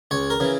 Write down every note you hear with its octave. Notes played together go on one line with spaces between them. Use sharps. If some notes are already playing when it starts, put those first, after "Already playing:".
C#2 C#5
A#4
C#3 E3